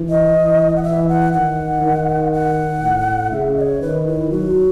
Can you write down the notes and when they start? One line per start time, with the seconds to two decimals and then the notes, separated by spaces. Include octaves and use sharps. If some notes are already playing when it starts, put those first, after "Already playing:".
Already playing: E3
0.09 D#5
0.33 E3
0.76 F#5
0.83 E3 E5
1.08 F#5
1.33 D#3 F#5
1.82 D#3
2.33 F#5
2.82 A2
3.32 C#3 E5
3.57 D#5
3.61 C#5
3.81 D#3 B4
4.07 E4
4.31 F#3 F#4